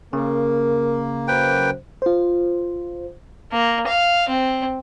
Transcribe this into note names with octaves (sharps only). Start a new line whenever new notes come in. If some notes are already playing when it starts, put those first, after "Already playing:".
C#3 A#3 A#4
F#2 F#3 B4 C5 G5
F4 C5
A#3
F5
C4